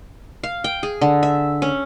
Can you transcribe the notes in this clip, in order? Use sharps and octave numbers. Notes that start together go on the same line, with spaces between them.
F5
G5
G#4
D3
E5
C#4